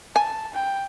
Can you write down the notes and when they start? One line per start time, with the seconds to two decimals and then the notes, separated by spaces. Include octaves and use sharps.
0.16 G#5 A5
0.54 G5